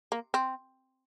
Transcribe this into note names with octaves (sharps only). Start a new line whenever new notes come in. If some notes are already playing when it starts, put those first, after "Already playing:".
A#3
C4